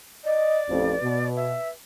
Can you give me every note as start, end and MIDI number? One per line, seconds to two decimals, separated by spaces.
0.25 1.28 74
0.25 0.57 75
0.68 0.94 33
0.68 0.94 41
0.68 1.72 71
1.02 1.53 47
1.36 1.68 76